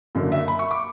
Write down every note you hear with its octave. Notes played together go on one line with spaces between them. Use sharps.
F#1 F#2 D3 A#3
E5
B5
C#6
D6